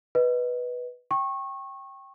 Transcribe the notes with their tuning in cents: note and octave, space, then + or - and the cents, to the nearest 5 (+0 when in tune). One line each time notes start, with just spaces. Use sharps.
B4 +0 D#5 +0
G5 -5 C#6 -25